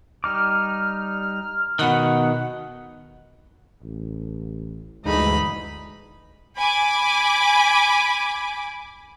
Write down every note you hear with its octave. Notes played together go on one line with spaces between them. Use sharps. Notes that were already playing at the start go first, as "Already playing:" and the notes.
G3 D#4 D6 F6
B2 D#3 F#5
A1
G1 D2 D3 E3 G#3 D#4 B5
G#5 B5 D6